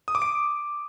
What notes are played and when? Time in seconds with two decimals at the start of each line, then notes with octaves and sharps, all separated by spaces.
0.08 D#6
0.15 D6
0.22 D7